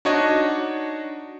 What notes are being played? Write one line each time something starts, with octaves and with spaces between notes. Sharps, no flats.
D4 D#4 F#4 C#5 D#5